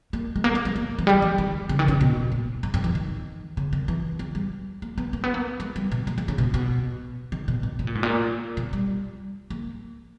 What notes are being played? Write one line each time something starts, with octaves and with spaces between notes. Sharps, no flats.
A#3
G#3
A#3
G#3
G#3
A#3
E3
G3
E3
D#3
C#3
D#3
C#3
B2
A#2
G#2
G2
E3
D#3
C#3
D#3
E3
E3
G3
A#3
B3
A#3
B3
A#3
G#3
G3
B2
A#3
A#3
C#3
B2
B2
D#3
B2
A#2
B2
A#2
G#2
A#2
B2
G3
A#3